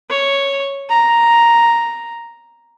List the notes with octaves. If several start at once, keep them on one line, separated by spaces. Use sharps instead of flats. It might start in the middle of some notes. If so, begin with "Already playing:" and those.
C#5
A#5